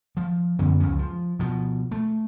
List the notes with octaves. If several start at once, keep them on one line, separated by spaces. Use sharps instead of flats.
F3
F#2 D3 B3 C#4
C#2 F#2 F3 C#4
F3
B2 F3
A3